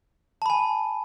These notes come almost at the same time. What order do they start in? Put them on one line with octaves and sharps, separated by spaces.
A5 B5 G#5